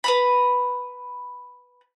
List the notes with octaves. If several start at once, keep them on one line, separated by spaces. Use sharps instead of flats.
B4 A#5 B5